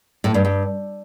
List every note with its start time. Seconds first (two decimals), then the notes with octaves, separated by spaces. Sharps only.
0.24 A2
0.34 G2
0.45 G2